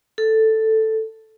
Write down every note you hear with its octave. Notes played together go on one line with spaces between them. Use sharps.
A4